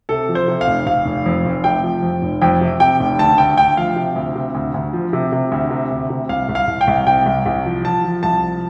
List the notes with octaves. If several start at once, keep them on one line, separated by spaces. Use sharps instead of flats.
C3 A4
F3
C5
C3
F5
F1
F1 F5
F1
F2
F1
C3 G5
F3
F2
F1
F2 G5
C3
C3 G5
F1
D2 A5
D2 G5
D2 G5
F3 F5
C3
D2
C3
D2
D2
F3
C3
C3
D2
C3
D2
C3
C2 F5
C2
F5
C2
G5
C2
C3 G5
C2
C2
F3
F3 A5
F3
C2 A5
F3